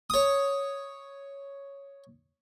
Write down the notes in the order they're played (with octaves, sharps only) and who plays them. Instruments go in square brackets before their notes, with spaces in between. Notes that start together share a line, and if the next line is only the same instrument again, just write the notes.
[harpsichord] C#5 D#6